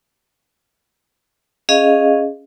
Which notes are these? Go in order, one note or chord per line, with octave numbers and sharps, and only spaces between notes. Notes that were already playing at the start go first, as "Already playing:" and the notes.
C#4 G#4 D#5 F5